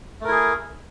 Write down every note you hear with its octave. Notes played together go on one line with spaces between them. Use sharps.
A3 E4 G#4 A#4